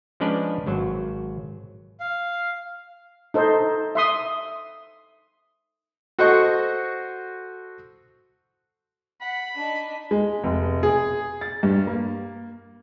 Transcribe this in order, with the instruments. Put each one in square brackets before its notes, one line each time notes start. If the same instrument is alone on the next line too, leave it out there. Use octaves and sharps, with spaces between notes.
[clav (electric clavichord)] F3 G#3 C#4 D4 B4 D5
G#1 F#3 C5
[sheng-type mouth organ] F5
[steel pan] D#4 A4 C5
E5 C6 D#6
[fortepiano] F#4 A4 C5 D#5 F#5 C#6
[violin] F#5 [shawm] B5
[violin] D4 D#4
[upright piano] G#3
F1
G#4
A6
G2
A#3